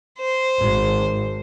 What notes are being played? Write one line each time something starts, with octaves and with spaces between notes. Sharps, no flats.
C5
G#1